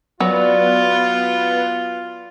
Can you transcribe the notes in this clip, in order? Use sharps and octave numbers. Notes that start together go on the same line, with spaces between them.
F#3 B3 F4 D5